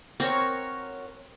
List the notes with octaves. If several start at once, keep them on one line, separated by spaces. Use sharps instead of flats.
C4 F#4 A#4 C#5